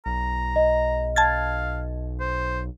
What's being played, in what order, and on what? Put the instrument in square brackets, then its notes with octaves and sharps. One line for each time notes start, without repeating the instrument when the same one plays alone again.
[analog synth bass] B1 [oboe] A#5
[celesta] D#5
[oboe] F5 [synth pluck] A5 G#6 A6
[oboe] C5